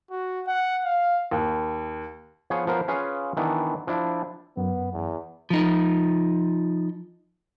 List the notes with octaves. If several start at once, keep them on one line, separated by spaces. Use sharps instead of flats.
F#4
F#5
F5
D#2
F3 B3 G#4 C#5 F5
F3 B3 A#4 C5 C#5
C#4 F4 G#4 B4 F5
D#3 E3 B3 D4
F3 D4 E4
F#2 B3
E2
F3 D#4